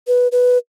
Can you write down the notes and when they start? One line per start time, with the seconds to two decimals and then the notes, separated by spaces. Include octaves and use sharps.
0.07 B4
0.32 B4